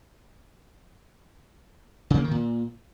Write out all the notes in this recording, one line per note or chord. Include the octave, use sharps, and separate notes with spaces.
C#3
A#3
D#3
A#2